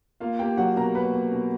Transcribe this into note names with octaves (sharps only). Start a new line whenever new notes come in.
A#3 F4 F5
A#3 G4 G5
F#3 F#4 F#5
B2 A#4 A#5
A#3 B4 B5
A#3
B2